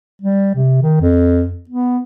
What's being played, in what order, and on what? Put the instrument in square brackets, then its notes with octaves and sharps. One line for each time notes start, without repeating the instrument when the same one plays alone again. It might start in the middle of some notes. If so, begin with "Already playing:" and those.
[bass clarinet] G3
C3
D#3
F2
B3